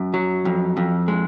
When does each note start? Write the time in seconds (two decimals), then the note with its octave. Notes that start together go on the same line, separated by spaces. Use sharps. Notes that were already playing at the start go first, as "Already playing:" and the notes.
Already playing: F#2
0.14 F#3
0.45 F2
0.77 F2
1.08 G#3